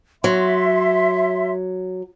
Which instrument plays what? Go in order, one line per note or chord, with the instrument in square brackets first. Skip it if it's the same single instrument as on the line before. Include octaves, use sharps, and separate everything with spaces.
[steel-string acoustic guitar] F#3 [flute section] E5 C6